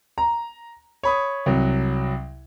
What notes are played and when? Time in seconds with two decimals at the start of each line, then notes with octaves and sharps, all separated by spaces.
0.18 A#5
1.03 C#5 B5 D#6
1.46 C2 F#3